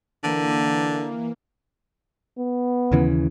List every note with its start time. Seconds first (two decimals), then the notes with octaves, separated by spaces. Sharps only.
0.24 D3 E3 A#3
2.39 B3
2.92 D#2 C#3 E3